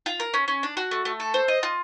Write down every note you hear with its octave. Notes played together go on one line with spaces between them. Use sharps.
F4
A#4
C#4
C#4
D4
F#4
A3
A3
A4
C5
D#5
F4